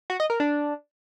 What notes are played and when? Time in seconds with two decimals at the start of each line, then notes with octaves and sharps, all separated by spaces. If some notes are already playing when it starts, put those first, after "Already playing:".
0.10 F#4
0.20 D#5
0.30 A#4
0.40 D4